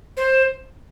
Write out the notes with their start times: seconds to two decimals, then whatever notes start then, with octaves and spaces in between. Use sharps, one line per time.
0.17 C5